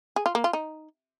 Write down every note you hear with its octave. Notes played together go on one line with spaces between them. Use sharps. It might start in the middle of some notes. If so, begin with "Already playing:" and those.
G#4
F4
A#3
F4
D#4